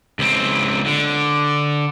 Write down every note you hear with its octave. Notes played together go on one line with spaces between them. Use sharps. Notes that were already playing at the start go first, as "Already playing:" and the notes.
C#2 C4
D3